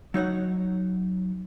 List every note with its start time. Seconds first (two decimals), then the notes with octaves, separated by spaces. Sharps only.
0.14 F#3 D#4 C#5 F#5